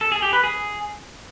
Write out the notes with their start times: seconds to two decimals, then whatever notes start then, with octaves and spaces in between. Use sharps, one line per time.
0.01 A4
0.12 G#4
0.22 G4
0.33 B4
0.43 G#4